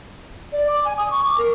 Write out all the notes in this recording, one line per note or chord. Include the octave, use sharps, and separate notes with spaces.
D5
D6
G#5
D#6
C#6
D6
A#4